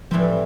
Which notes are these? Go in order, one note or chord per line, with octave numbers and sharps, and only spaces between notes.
A2 E3 F3 G3 C4